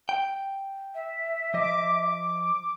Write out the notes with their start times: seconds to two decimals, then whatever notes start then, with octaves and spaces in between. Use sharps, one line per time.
0.09 G5
0.95 E5
1.54 F3 D#5 D6